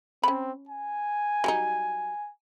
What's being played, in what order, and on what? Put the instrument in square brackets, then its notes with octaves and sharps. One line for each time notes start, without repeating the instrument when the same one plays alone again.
[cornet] C4 [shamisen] C#4 B5
[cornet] G#5
[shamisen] F#3 G3 D#4